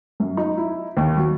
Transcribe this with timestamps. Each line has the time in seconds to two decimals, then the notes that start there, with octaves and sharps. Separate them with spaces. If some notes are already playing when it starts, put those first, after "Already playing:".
0.20 F#2
0.37 D#4
0.57 E4
0.97 D#2
1.17 F#3